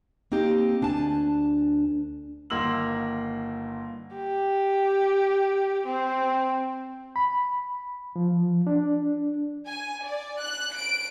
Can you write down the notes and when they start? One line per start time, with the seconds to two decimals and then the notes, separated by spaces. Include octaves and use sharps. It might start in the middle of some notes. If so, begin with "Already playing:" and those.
0.32 A#3 C4 D#4 G4
0.82 D2 D4 G#5 A5
2.50 G1 D#3 A#3 C6 E6 F#7
4.16 G4
5.86 C4
7.16 B5
8.16 F3
8.67 D4
9.66 G#5
10.03 D5
10.40 F#6
10.76 D7